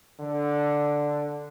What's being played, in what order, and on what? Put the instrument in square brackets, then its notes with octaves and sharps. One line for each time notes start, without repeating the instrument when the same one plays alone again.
[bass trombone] D3